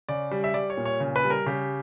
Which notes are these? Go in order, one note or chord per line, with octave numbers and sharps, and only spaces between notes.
C#3 D5
G3
E5
G3 D5
C#5
A#2
C#5
C#3
B4
G3
A#4
C#3 G4